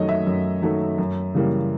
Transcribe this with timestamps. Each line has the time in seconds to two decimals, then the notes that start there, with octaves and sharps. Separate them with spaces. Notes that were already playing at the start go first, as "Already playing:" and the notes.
Already playing: F#2 D#3 F#3 A3 C#5 D#5
0.09 E5
0.27 F#2
0.62 D#3 F#3 A3
0.98 F#2
1.35 C#3 E3 G3 A#3